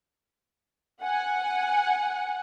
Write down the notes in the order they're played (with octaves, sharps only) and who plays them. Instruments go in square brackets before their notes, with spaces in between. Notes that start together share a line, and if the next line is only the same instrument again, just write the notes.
[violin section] F#5 G#5